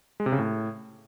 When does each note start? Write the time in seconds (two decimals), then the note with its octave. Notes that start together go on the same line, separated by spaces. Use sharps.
0.20 G#3
0.26 C3
0.32 C#3
0.39 A2